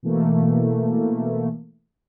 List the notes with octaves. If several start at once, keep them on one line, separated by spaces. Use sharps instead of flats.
B2 E3 A3 A#3